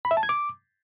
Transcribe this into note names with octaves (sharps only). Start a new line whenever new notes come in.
B5
E5
A5
G#6
D6